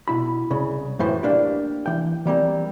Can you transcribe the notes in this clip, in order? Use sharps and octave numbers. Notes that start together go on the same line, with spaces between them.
B2 E4 B5
C2 C#3 B5
F#2 A2 E3 C5
A#3 D4 G4
E3 G5
E3 G3 A#3 C4